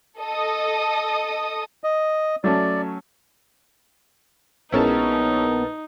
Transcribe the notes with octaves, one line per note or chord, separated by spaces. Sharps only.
A4 D#5 D#6
D#5
F#3 A3 C#4 D5
A#1 G#3 B3 C#4 D#4 E4 A#4 A5